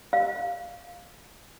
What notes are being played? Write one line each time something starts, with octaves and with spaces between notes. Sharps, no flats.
F5